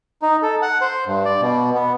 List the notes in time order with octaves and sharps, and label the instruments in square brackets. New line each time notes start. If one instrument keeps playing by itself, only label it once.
[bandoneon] D#4
A4
F#5
C5
G2
D5
B2
B3